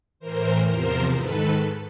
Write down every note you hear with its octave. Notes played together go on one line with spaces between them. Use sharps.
A2 E3 A#4 C5
E2 C3 F3 A#4 C5
G#2 D#3 A4 B4